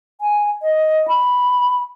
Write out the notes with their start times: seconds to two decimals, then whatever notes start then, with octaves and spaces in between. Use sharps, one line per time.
0.21 G#5
0.62 D#5
1.08 B5